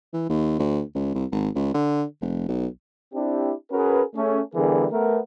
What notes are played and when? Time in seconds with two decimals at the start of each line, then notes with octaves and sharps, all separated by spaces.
0.13 E3
0.30 D#2
0.59 D2
0.95 C#2
1.15 C2
1.32 G#1
1.56 C#2
1.74 D3
2.21 F1
2.48 B1
3.14 C4 D4 E4 G4
3.72 C#4 F#4 G#4 A#4 B4
4.15 A3 C#4 G#4
4.55 D3 E3 G3 B3 G#4 A#4
4.91 A3 B3 A#4